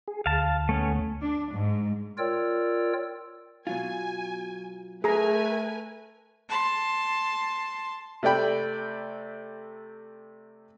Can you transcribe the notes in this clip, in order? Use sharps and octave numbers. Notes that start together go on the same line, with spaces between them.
G#4
D2 F5 A5
A3 B3 C#4
D4
G#2
F4 A#4 C#5 D5 G5 E6
B2 F#3 F4 G#5
A3 G#4 A#4 B4 G#5 A#5
A5 C6
C3 A3 D5 G5 B5